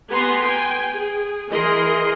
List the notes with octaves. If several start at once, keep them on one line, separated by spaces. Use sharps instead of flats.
B3 G4 G#5 A#5 C6
G5 G#5
G#4
E3 G#4 A#4 D#5 C6